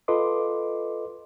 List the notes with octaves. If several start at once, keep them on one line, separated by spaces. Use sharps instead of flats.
F4 A4 B4 D#5 C6 D6